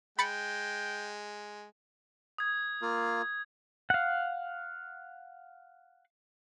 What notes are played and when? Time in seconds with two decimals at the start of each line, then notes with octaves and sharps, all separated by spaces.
0.19 G#3 G5 B5 A6 C#7
2.38 D#6 G#6
2.82 A#3 F4
3.90 F5 F#5